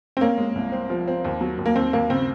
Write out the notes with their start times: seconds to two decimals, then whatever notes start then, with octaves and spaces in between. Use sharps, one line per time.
0.17 C4
0.21 A#3 C#4
0.38 G#3
0.55 C2
0.72 C4
0.90 F3
1.08 C4
1.25 D#2
1.41 F#3
1.58 D#2
1.66 A#3
1.76 D#2 C4
1.93 D#2 A#3
2.10 C#3 C4